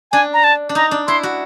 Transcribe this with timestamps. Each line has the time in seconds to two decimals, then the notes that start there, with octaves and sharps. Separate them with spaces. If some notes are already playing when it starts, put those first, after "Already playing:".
0.12 D4 G#5
0.33 A#5
0.44 A5
0.69 D4
0.75 D#4 A#5
0.91 D4
1.07 E4 C6
1.23 F#4